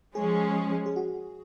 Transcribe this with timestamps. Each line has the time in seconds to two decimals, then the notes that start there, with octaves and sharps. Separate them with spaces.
0.15 F3 G#3 C#4 G#4
0.86 G#4
0.96 F#4